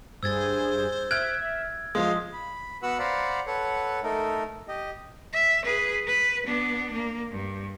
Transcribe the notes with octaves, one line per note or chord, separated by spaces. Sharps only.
G2 G#4 C5 E6 G#6 A6
E5 F6 F#6 G#6 D7
F3 G#3 F5 C6 D#6
B5
B3 F#4 B4 F#5 E6 F#6
C5 D5 F5 F#5 A#5 B5
A4 B4 C#5 F#5
A3 D#4 A4 A#4
G4 D#5
E5
G#4 B4
B4
B3 D4
A#3
G2